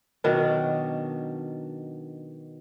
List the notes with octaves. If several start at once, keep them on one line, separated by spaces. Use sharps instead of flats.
B2 D#3 F#3 D4